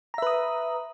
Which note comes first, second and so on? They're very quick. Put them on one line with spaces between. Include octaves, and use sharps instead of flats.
A#5 E5 B4 D#6